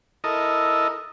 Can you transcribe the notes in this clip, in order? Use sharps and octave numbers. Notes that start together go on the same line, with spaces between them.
E4 A4 A#4 D#5